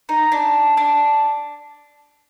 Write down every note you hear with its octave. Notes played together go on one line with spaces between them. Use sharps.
D#4
D4
D4